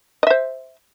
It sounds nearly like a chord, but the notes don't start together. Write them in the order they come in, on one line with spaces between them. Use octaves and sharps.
D#5 E5 C5